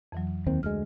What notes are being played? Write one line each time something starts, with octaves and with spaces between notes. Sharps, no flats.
F2 E3 F#3
D#2 D#3 C4
D2 G#3 F6